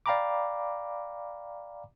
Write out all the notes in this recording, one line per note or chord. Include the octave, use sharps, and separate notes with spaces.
D5 F5 G5 A#5 B5 D6